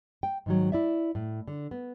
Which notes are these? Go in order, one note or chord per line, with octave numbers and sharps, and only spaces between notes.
G5
G#2 D#3 F#3
E4 D5 E5
A2
D3
B3